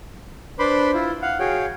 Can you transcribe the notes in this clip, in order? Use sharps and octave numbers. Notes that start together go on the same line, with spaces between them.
D4 B4 C5 B5 C6 D6
E4 F4
F5 F#5
F#4 G#4 C#5 F5 G5